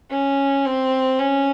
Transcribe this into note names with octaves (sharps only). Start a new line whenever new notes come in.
C#4
C4
C#4